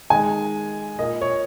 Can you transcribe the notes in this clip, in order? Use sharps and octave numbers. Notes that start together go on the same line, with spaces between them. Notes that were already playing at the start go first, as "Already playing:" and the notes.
D#3 G#3 G#5
A#2 A#3 D#5
C#5